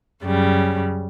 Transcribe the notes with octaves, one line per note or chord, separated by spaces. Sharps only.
F#2 C#3 G3